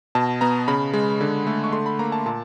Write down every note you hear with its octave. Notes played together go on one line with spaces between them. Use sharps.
B2 A5
B3 A#5
C#3 B5
G#3
D3
A3
C#6
D3 C6
B5
A#3 A#5
A5
A#2 A5